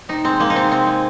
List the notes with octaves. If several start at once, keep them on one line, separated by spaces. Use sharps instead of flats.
C3 D#4
G#3 C4
G#3 A#3
D#4
C3 C4
C3 C4
G#3